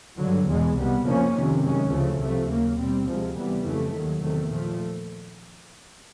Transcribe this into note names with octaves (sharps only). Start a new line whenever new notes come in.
G2 D3 F#3
E2 B2 G#3
C2 B2 G3 B3
F2 C#3 F3 A#3 C#4
F2 C3 D#3
F#2 D#3 G#3 C#4
D2 C#3 F3 A3
C2 C3 F3 A3
D#2 C#3 F#3 A#3
B2 G3 C4
D2 C3 F3 G#3
C3 E3 G3 B3
F2 C#3 E3 A3
D#2 D#3 F#3
E2 C3 D#3 F#3 A3
A#2 F3 A3